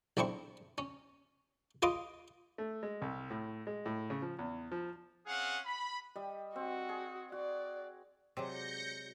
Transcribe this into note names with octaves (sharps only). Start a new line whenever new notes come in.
B1 C4 D4 E4 C5 C#6
C#4
F4 B4 D#5 C6 D6 D#6
A3
G#3
C2
A2
G#3
A2
C#3
F3
E2
F3
C4 C#4 G#4 F5 F#5
B5
G3 D#5
C4 F#4
G#4
F#4 D5
C3 F#3 G#3 D5 G6 A#6 C#7